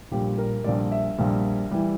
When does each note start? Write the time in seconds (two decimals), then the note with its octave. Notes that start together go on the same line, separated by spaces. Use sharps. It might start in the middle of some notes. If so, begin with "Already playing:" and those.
0.11 A#1 A#2 G3 G4
0.38 A#4
0.64 A#1 A#2 G3 D5
0.92 E5
1.18 A#1 A#2 G3
1.71 E3 G3